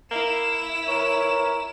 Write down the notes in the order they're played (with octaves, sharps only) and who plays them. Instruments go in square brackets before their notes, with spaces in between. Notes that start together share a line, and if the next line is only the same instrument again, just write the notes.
[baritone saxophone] A#3 [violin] E4 E7
[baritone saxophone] E3 [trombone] A#4 [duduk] C#5